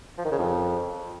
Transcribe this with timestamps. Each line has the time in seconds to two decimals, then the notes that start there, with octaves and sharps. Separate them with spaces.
0.18 F3
0.25 D#3
0.32 C#3
0.39 F2